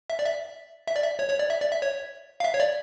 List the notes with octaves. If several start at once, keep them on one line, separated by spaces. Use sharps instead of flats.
E5
D5
E5
E5
D5
E5
C#5
C#5
D5
E5
D5
E5
C#5
F5
E5
C#5
D5